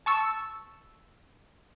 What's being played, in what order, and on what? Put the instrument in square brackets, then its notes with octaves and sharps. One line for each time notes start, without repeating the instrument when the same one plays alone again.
[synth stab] A5 C#6 E6